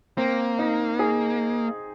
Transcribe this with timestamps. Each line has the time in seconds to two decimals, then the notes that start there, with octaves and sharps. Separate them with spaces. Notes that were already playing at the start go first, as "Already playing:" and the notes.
0.17 A#3 C4
0.59 D#4
0.99 G#4